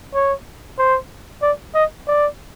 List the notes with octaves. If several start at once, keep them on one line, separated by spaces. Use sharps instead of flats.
C#5
C5
D5
D#5
D5